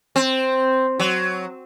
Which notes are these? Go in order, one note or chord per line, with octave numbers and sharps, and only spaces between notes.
C4
F#3